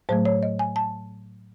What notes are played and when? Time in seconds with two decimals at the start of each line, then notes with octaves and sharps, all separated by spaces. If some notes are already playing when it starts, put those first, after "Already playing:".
0.09 A2 F#3 A3 C5
0.25 C#5
0.43 D#5
0.59 G#5
0.76 A5